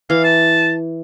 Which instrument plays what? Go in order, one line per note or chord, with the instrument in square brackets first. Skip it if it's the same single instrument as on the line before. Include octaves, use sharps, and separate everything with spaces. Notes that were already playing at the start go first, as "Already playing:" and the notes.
[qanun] E3 [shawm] F5
[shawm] A5